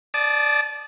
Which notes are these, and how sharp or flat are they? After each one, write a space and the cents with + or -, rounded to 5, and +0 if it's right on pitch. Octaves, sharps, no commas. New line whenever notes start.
D5 +0 A5 -30 D#6 -10